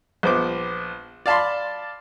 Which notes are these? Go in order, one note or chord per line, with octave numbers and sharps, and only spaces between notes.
A#1 B3 C5 D6
D5 F5 A5 B5 C6